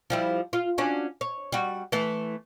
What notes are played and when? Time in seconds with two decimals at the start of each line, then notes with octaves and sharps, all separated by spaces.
0.10 F3 G3 E4
0.53 F4
0.78 C#4 D4 F#4
1.21 C#5
1.52 G3 F#4
1.92 E3 A3